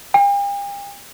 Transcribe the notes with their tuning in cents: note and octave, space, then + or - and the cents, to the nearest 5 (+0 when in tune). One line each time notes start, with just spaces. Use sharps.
G5 +45